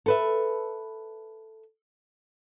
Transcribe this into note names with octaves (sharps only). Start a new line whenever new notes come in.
A4 B4 E5